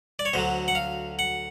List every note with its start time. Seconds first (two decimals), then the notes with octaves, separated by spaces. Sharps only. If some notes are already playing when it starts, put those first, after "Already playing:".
0.19 D5
0.25 C#5
0.33 D2 D3 F#3 C5
0.68 F#5
0.75 F5
1.19 F#5